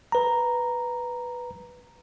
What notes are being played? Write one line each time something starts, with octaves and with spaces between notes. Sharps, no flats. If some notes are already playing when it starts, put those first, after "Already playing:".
B4 A#5